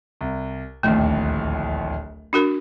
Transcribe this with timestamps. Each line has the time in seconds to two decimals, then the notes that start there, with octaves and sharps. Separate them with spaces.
0.21 C2
0.83 D1 A#1 D#2 A3
2.33 D4 F#4 A#4